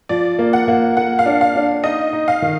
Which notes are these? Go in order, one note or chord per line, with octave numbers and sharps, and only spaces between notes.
F3 D5
A#3
F#5
A#3
A#3 F#5
F5
D4
F5
D4
D#4 D#5
D#4
F5
D#3